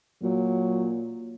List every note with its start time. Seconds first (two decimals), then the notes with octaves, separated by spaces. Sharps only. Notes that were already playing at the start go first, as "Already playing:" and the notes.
0.23 A#2 F#3